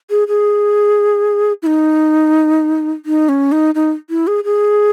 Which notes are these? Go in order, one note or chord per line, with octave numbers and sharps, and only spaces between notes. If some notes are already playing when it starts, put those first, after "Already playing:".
G#4
G#4
E4
D#4
D#4
C#4
D#4
D#4
E4
G#4
G#4